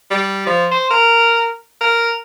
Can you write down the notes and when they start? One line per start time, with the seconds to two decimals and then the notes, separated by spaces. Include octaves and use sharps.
0.11 G3
0.47 F3
0.71 C5
0.90 A#4
1.81 A#4